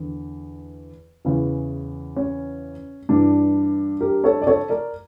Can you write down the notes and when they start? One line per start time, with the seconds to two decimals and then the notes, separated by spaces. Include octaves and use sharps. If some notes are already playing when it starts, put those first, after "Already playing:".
Already playing: E2 D3
1.25 E2 C#3 E3
2.16 C#4
3.09 G2 E3 D4
4.01 G4 A#4
4.24 A4 C#5
4.42 D5
4.47 A4 C#5
4.69 A#4 D5